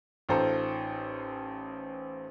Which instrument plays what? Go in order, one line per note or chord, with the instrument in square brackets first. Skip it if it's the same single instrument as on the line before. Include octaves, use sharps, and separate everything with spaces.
[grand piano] A1 D#4 F4 A4 C5 A#5